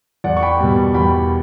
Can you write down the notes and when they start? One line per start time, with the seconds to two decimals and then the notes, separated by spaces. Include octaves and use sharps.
0.24 E2 D5 F#5
0.37 C#6
0.43 G5 B5
0.60 B2 G3
0.94 E2 G5 B5